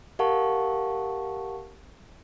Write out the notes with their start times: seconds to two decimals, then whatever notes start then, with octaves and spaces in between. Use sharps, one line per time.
0.19 G4 A#4 F5 F#5 A5 C#6